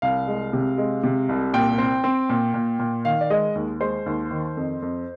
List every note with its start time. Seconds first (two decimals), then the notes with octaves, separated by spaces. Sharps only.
0.02 C2 F5
0.28 G#3
0.53 C3
0.78 G#3
1.04 C3
1.29 C2
1.54 A#2 G5
1.78 C4
2.04 C4
2.29 A#2
2.54 A#2
2.79 A#2
3.05 D#3 F5
3.21 D5
3.30 G#3 D#5
3.55 D#2
3.81 G#3 C5
4.06 D#2
4.31 D#3
4.57 F2
4.82 F2